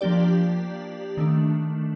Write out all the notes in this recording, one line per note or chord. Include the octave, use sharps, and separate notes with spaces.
F3 A#3 D4 G4 D5
D#3 A3 D4